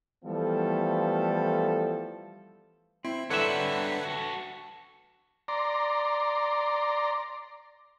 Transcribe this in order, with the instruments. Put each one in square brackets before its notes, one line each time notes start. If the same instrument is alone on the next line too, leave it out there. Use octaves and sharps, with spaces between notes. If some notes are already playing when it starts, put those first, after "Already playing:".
[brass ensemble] E3 F3 G3 A3 B3 A4
[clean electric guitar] C4 [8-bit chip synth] E4
[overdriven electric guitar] D3 G3 [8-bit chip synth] A4 B4 F#5 [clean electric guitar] C#5 E5
[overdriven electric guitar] F#4 A4
[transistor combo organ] D5 A#5 C6